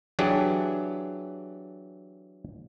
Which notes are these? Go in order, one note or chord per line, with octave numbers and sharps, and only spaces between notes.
E3 F#3 D4 G4 G#4